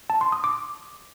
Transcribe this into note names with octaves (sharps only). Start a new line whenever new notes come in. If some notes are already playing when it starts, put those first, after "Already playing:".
A5
C6
D#6
D6